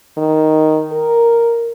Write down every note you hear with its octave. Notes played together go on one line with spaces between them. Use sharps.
D#3
A#4